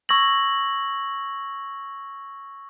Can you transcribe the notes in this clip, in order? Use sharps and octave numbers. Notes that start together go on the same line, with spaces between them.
C#6 E6 G#6 A#6 F#7